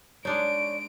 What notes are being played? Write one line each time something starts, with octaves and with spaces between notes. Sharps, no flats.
G#3 D4 D#4 C#5 D5 D7